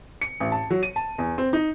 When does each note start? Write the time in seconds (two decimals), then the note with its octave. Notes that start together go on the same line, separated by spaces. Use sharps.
0.21 C#7
0.40 A1
0.52 A5
0.70 F#3
0.83 D#7
0.96 A5
1.18 E2
1.38 C4
1.53 D#4